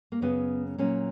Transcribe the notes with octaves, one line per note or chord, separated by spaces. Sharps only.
A#3
F#2 C#3 F#3 B3
A#2 F#3 C#4